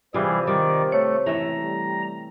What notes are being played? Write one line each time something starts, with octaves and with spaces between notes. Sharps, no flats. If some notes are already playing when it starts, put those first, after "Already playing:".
C3 E3 G3 F4 G#4 C5
D#3 G3 D5
A3 C#5
C#2 F#2 A2 E3 A3 E5 A#5
G3